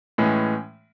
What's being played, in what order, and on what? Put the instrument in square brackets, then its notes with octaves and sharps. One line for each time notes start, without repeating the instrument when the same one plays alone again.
[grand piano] A2 E3 G#3 C#4